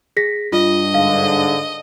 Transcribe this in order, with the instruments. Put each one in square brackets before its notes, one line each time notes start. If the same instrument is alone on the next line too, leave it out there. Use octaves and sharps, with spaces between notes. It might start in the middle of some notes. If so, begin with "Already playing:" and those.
[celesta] G#4 A#6 B6
[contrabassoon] G2 [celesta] F4 [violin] D#5
[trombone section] G#2 D3 [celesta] F5